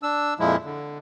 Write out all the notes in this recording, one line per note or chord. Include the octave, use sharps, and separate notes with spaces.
D4 E6
F2 A#2 F3 G#3 E4
D3